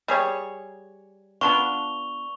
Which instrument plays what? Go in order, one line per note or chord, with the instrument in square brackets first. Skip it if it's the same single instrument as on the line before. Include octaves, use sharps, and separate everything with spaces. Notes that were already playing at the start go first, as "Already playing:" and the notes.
[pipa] G3 G#4 C#5
[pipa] B3 D4 F4 [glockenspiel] C#6 F7 G7